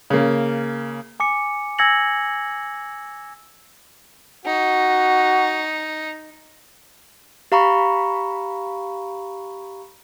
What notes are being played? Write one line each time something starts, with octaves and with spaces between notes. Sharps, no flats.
C#3 A#3
G#5 D6 C#7
G#5 E6 G#6 A#6 C#7 F#7
D#4 F#4
G4 F5 A#5 B5 C#6